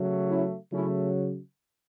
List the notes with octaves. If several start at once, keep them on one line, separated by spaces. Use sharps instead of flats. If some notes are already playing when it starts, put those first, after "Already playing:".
Already playing: C#3 F#3 A3
C#4 E4
C#3 F#3 A3 C#4 E4